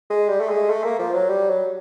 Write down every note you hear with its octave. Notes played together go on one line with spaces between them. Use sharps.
G#3
G3
A3
G#3
A3
A#3
F3
F#3
G3
F#3